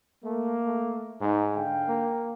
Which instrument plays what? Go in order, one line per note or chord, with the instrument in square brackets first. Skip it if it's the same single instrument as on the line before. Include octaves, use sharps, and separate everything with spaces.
[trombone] A3 [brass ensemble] A#3
[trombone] A3
[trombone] G#2 [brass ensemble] D#4
[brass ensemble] D3 F5 G5
[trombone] A#3